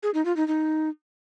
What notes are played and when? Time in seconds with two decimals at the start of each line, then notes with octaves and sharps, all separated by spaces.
0.03 G#4
0.14 D#4
0.25 F4
0.37 D#4
0.48 D#4